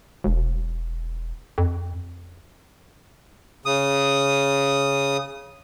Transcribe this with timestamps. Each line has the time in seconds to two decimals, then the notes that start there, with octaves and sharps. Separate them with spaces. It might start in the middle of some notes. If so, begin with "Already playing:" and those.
0.24 E1
1.58 F2
3.66 C#3 D#6